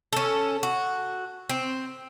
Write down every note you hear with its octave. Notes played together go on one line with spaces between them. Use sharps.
C#4 A4
F#4
C4